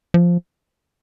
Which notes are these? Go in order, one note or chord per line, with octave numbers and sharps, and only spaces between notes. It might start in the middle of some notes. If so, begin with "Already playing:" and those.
F3